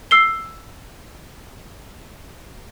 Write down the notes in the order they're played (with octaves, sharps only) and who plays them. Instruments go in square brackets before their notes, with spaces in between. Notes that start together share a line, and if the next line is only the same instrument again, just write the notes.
[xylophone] E6 C7 G7